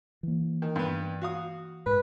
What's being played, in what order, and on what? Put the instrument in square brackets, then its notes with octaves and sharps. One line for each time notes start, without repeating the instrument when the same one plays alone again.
[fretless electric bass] E3 A#3
[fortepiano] D#3
G2 B3
F#4 F5 D#6
[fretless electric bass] G#2 [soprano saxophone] B4